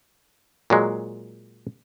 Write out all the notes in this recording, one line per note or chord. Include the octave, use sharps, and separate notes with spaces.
A#2 F#3 G#3